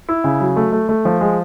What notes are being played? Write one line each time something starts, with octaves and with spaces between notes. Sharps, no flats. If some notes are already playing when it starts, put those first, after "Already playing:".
E4
C#3
F#3
A3
A3
A3
F3
G#3